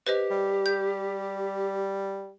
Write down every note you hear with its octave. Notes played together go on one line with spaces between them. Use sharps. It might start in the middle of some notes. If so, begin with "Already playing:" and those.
G4 B4 C5 D#5
G3
G6